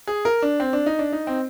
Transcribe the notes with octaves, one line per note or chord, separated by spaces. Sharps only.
G#4
A#4
D4
C4
D4
D#4
D4
D#4
C4